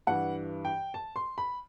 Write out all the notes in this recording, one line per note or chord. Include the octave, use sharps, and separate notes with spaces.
G2 E3 F#5
G5
A5
C6
B5